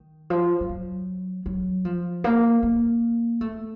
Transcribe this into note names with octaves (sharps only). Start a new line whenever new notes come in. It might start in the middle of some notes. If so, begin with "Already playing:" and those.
Already playing: D#3
F3
F3
F#3
F#3
F3
A#3
A#3
A3